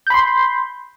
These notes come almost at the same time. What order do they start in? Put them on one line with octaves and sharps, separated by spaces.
G6 B5 C6